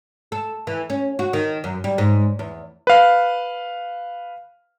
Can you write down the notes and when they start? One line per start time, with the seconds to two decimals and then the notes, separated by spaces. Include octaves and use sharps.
0.32 A4
0.67 E3
0.90 C#4
1.19 F#4
1.33 D#3
1.64 F#2
1.84 G3
1.98 G#2
2.39 E2
2.87 B4 F5